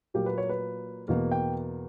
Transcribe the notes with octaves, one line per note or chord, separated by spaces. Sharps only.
A#2 F#3 A#3 G4
B4
C#5
B4
E2 B2 A#3 A#4
G5